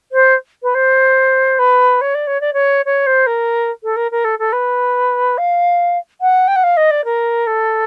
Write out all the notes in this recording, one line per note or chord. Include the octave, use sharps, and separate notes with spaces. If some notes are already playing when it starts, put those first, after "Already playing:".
C5
B4
C5
B4
C#5
D5
C#5
D5
C#5
C#5
C5
A#4
A4
A#4
A#4
A4
A4
B4
F5
F#5
G5
F#5
F5
D#5
D5
A#4
A4